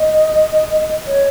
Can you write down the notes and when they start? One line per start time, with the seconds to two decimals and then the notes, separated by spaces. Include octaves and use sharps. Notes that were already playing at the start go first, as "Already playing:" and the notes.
Already playing: D#5
1.07 C#5